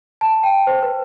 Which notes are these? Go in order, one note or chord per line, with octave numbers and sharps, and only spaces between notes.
A5
G5
C5
B4